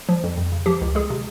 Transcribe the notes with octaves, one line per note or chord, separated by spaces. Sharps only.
F3
F2
F2
C#3
F3 G4
C#2
G#3 G#4
C3